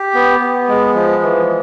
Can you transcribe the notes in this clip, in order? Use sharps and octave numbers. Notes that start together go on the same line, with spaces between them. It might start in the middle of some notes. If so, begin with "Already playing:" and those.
Already playing: G4
B3
B3
G#3
F3
E3